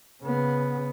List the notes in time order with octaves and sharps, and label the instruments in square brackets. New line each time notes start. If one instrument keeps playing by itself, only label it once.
[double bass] C#3 B3